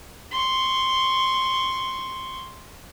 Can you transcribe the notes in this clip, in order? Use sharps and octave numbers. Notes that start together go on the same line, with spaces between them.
C6 C#6